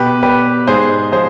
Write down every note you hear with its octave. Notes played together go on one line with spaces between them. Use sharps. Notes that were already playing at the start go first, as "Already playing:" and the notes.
Already playing: B2 G4 B4
G3 G4 B4
G#2 G#4 C5
F3 G#4 C5